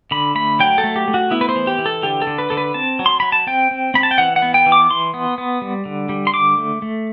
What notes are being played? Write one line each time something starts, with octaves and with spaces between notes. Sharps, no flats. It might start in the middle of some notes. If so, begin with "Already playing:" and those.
D3 B5
A3 B5
F#3 G5
A4
A3
G4
A3
F#4
B3 E4
B4
C5
E3
G4
E3
A4
D3 G4
A4
D3
B4
D3 A4
B4
C4 A5
F#3
C6
F#3 B5
A5
C4 G5
C4
C4 B5
A5
G5
E3 F#5
F#5
B3
G5
E3
D6
E3 C6
B3
B3
G3
D3
G3
C6
D3 D6
A3
A3